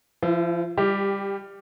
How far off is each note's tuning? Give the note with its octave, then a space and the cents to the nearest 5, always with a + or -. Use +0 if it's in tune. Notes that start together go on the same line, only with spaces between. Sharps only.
F3 -25 E4 +25
G3 +20 G4 +0 G5 +0